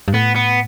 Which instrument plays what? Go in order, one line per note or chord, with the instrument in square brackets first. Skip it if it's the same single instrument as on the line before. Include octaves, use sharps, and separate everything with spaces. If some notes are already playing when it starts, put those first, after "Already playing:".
[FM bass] G2
[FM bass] A2 [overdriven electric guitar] B3
[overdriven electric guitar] B3